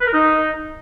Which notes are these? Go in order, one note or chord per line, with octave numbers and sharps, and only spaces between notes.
B4
A#4
D#4